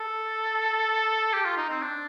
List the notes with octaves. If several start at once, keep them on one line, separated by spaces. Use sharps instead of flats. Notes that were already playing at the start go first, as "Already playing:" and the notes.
Already playing: A4
G4
F4
D#4
C4
D4